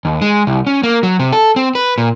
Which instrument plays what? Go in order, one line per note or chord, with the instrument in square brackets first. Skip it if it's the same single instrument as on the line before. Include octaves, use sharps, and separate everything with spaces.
[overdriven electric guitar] D#2
G#3
C2
C#4
A#3
F#3
C3
A4
C4
B4
A#2